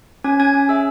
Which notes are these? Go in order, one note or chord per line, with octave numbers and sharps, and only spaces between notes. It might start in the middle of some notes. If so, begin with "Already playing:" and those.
C#4 G#5 G#6
C#4 G#5 G#6
C#4
G#4 E5 E6